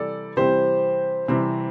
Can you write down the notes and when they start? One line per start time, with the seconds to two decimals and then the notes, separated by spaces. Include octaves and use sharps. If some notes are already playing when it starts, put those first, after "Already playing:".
Already playing: C3 E3 G3 A4 D5
0.37 C3 E3 G3 C4 G4 C5
1.28 C3 E3 G3 C4